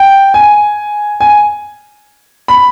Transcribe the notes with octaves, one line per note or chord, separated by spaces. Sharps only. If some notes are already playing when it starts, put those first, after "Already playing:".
Already playing: G5
G#5
G#5
B5